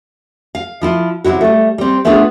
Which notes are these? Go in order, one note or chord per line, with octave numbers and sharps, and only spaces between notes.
F5
F3 E4 F4
C3 F#3 E4 F#4
G3 A3
G3 C4
A3 B3 D4 F4 G#4 A4